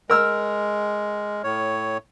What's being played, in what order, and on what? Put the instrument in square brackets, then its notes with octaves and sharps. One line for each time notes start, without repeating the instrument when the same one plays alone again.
[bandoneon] G#3 [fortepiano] A#4 E6 F6
[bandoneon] A2 C#5